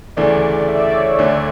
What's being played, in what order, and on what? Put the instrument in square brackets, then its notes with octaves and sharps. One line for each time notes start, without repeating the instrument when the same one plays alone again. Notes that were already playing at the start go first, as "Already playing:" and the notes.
[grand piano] D2 C#3 E3 A3 [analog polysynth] D5
[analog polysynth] D5
E5
D5
C#5
D5
[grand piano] D2 D3 A3